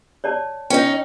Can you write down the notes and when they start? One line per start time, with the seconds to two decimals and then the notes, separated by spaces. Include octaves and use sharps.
0.24 C#5 D5 A5
0.70 C#4 D#4 G5